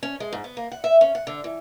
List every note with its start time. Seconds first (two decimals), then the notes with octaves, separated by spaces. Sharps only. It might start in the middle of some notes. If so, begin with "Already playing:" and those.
0.03 C#4
0.20 G#3
0.33 G#2
0.44 B3
0.57 A#3
0.72 F#5
0.84 E5
1.01 C#4
1.15 F#5
1.27 D3
1.44 E3